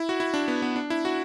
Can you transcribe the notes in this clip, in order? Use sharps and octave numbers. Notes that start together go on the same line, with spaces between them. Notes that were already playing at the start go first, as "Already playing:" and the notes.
Already playing: E4
F#4
E4
D4
B3
B3
D4
E4
F#4